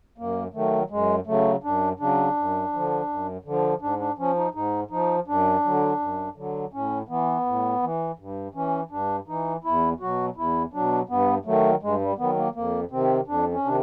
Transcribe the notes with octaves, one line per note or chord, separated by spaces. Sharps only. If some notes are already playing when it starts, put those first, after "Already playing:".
F#2 A#3
D#3 F#3 A3
F#2 G#3
C#3 F#3 A3
F#2 D4
C#3 F#3 D4
F#2
D3 F3
F#2
D3 F3
G#2 D4
D4
F3 C#4
D#4
G#2 D#4
F3 D#4
F#2 D4
D3 F#3
F#2
D3 F#3
A2 C#4
E3 B3
A2
E3
G2
E3 C#4
G2 D4
E3 D#4
E2 E4
B2 F#3 F#4
E2 E4
B2 F#3 D4
G2 B3
D#3 F#3 A3
G2 G#3
G3
D#3 F#3 B3
A#3
F2 A#3
C3 D#3 C4
F2 D4
C#4
C3 D#3 D4